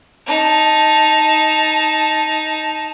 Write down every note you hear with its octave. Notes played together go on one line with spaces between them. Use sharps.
D#4 A5